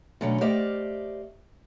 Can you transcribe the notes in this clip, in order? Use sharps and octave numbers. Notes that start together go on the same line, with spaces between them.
B2 D3 F#3 A3 C#4
A3 G4 C5 D5 D#5 F5